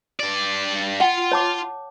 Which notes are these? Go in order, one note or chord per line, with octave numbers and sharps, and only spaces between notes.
G2 D5
F4 F#5 G5 C6
C#5 A5 D6